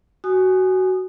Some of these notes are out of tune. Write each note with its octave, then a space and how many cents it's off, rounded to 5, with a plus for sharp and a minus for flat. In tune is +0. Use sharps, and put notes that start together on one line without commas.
F#4 +15 G#5 +0 D#6 -20